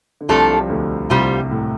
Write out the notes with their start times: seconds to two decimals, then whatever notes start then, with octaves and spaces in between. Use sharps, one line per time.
0.21 D3
0.29 C2 C3 F3 A3 D4 A4
0.54 G3
0.61 F3
0.70 D2 D3
1.10 C2 C3 G3 F4 C5
1.51 A2